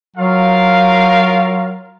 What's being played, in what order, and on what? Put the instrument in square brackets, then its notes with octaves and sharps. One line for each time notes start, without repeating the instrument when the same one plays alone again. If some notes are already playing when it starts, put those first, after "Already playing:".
[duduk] F#3 [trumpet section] F4 A#4 F5